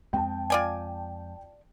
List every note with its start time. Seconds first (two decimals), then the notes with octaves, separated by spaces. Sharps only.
0.13 F2 G#3 C4 G5 A5
0.50 F4 D5 G#5